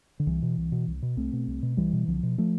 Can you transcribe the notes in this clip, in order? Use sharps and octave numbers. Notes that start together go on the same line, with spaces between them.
D3
C2 E3
B2
C2
B2
C2
B2
C2 A3 C4
B2
C2
B2
C2 E3 G3
B2
C2 D3 F3
B2
F3 A3